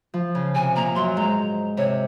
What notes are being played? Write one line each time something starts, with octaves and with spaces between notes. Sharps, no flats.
F3
C#3
C3 G#5
A#2 A#5
F#2 C6
G#2 A#5
C3 C#5